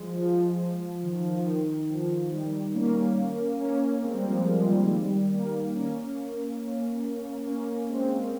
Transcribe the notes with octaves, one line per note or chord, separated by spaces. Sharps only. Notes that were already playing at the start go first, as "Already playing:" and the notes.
Already playing: F3 G#3
F3
D#3
F3
F3
D#3
F3
D#3 G3
A#3 C#4
A#3 C#4
G#3 C4
G3 A#3
F3 G#3
F3
G3
G#3
D#3 G3
G3 A#3
A#3 C#4
A#3 C#4
G#3 C4